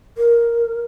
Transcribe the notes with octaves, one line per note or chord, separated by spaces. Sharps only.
A#4